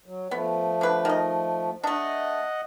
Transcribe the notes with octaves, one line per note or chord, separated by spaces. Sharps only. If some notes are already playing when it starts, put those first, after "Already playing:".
F#3
F3 A3 B3
D3 B4
D#3 D#5
A3 D4 D#5 F#5